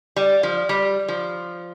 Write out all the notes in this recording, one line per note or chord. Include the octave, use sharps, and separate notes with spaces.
G3
F3
G3
F3